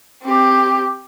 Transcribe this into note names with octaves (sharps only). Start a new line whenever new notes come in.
C4 G4